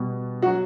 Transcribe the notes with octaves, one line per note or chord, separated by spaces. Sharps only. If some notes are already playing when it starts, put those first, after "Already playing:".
Already playing: B2 G3 B3
F#4
F#3